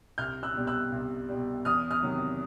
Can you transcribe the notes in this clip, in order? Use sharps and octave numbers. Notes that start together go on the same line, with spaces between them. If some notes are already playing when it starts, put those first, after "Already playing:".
C2 F6 G6
E6 F#6
B2 G3
E6 F#6
C2
B2 G3
E2 D#6 F6
D#6 F6
C3 D#3 F#3